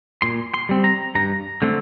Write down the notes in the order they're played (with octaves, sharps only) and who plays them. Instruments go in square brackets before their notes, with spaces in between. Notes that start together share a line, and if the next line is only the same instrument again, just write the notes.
[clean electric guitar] A#2 C6
C6
G3 C4
A#5
G2 A#5
D3 A3 C4